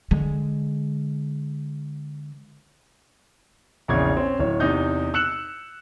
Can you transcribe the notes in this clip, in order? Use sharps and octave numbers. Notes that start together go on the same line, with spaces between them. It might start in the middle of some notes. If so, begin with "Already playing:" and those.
D3 G#3
A#1 E2 C#3 C#6 G#6
C4 C#4
D1 C#5
E2 C3 D#4 G6
E6 F#6 C#7 E7 F#7